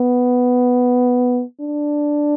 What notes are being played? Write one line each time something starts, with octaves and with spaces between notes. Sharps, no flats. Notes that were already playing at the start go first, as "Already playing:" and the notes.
Already playing: B3
D4